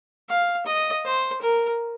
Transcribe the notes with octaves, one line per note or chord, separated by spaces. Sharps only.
F5
D#5
C5
A#4